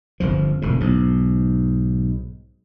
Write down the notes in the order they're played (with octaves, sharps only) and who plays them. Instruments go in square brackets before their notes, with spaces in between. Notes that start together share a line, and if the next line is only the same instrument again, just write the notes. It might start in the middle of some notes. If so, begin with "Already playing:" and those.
[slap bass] G1 F2 F3
E1 D2 G#2
B1 G#2